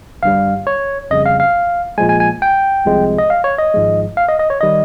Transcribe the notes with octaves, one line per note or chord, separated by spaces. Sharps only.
G1 G2 G3 F5
C#5
F2 C#3 G3 D#5
F5
F5
A#1 A#2 F3 G#3 G#5
G#5
G#5
G5
C2 C3 F3 G#3
D#5
F5
C#5
D#5
G#1 G#2 F3 G#3
F5
D#5
D#5
C#5
D#3 G3 D#5